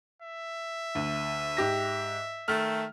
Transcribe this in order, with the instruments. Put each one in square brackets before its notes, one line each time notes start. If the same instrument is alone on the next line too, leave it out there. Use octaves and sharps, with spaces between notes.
[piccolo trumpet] E5
[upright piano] D2
G#2 G4 A#6
[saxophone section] D#3 A3 [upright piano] F6